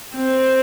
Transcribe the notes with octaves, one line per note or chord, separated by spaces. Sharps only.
C4